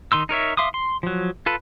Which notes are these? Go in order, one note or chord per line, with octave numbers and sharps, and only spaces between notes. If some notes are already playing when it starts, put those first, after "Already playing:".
D#3 D#4 C6 E6
D#4 A#4 C#5 E5
E5 F5 C6 D6 D#6
C6
F3 F#3
F4 A4 B4